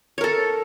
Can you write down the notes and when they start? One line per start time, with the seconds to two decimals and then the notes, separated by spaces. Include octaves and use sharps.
0.18 C#5
0.21 A#4
0.24 A4